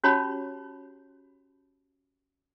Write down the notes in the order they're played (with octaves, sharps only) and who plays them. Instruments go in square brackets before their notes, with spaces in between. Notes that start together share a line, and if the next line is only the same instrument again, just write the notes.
[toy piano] C#4 F#4 G4 C#5 A5 B5